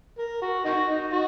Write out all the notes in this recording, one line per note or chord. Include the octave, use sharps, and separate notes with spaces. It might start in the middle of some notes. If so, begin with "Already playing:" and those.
A#4
F#4
D#4 F#4
D#4
F#4